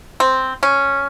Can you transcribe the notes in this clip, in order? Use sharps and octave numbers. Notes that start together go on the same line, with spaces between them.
C4
C#4